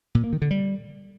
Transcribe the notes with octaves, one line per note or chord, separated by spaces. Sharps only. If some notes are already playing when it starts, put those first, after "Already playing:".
A#2
A#3
D#3
D3
G3